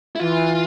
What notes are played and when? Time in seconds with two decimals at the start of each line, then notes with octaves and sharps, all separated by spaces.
0.16 E4
0.20 E3 F4